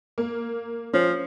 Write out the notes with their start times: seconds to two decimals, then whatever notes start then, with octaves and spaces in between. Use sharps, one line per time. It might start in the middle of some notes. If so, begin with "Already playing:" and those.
0.18 A#3
0.93 F3 C#4